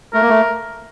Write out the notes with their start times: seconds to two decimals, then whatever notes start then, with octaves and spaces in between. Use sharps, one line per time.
0.13 A3 A#4
0.22 A#3
0.29 A3